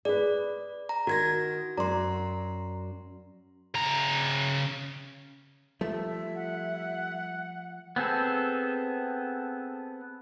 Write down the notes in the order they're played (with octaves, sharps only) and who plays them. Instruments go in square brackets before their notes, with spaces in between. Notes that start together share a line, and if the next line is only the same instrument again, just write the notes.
[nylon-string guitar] G#4 B4 [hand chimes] D5
[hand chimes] A#5
[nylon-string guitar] D#3 [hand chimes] F#4 G#6 A#6
[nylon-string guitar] F#2 D5 [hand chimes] A#5 C6
[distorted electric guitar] C#3 A#5
[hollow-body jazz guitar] F3 A3 [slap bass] G3 [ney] E5
[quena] F#5
[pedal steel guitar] B3 C4 G#4 A4